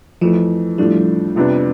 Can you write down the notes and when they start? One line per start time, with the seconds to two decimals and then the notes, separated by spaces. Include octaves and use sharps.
0.21 F2 E3 F3 A3
0.78 A2 F3 G3 A3 D4
1.36 F2 C3 F3 B3 D4